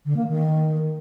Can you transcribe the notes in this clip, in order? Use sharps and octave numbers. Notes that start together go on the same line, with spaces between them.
D3
A#3
D#3